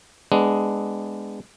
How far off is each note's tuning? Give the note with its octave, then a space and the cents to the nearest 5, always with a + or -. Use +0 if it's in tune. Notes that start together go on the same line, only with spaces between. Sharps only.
G#3 +0 B3 +20 D4 +0